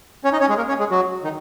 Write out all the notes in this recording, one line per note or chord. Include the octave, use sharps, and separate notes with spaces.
C#4 C#5
D#4 D#5
C#4 C#5
G#3 G#4
A#3 A#4
C#4 C#5
G#3 G#4
F#3 F#4
D#3 D#4